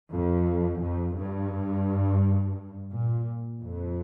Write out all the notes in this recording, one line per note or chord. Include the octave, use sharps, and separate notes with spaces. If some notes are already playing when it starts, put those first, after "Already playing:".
F2
F2
G2
A#2
F2